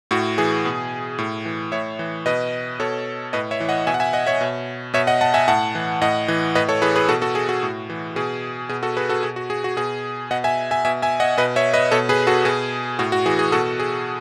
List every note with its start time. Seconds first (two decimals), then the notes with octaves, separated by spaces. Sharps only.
0.11 A2 F#4
0.38 E3 G#4
0.65 B2
1.18 A2
1.45 E3
1.72 A2 C#5 E5
1.99 E3
2.26 B2 B4 D#5
2.80 B2 A4 C#5
3.33 A2 B4 D#5
3.51 C#5 E5
3.60 E3
3.69 D#5 F#5
3.87 B2 E5 G#5
3.94 F#5
4.00 E5 G#5
4.13 D#5 F#5
4.26 C#5 E5
4.41 B2
4.94 B2 C#5 E5
5.07 D#5 F#5
5.21 F#5 A5
5.34 E5 G#5
5.48 A2 F#5 A5
5.75 E3
6.02 A2 D#5 F#5
6.28 E3
6.55 A2 B4 D#5
6.69 A4 C#5
6.82 E3 G#4 B4
6.96 G#4 B4
7.09 B2 F#4 A4
7.22 F#4 A4
7.35 G#4
7.49 F#4
7.63 A2
7.90 E3
8.16 B2 G#4
8.69 B2 G#4
8.83 F#4 A4
8.97 G#4 B4
9.09 F#4 A4
9.23 B2 G#4
9.36 F#4
9.50 G#4
9.64 F#4
9.77 B2 G#4
10.31 B2 D#5 F#5
10.44 E5 G#5
10.71 E5 G#5
10.85 B2 E5 G#5
11.02 E5 G#5
11.20 D#5 F#5
11.37 B2 B4 D#5
11.56 C#5 E5
11.73 B4 D#5
11.91 B2 A4 C#5
12.09 G#4 B4
12.27 F#4 A4
12.45 B2 G#4
12.99 A2 F#4
13.12 F#4
13.26 E3 G#4
13.39 G#4
13.52 B2 F#4 A4
13.80 G#4